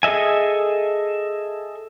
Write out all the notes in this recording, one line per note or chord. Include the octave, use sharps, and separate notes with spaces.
G#4 A4 D#5 E5 G#5